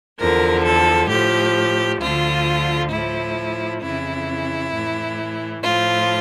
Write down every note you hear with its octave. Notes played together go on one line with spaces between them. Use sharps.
E2 D3 F3 A#4
A4
A2 F3 G4
D2 D3 F3 F4
A2 F3 E4
F2 C#3 E3 E4
A2 E3
A2 F3 F4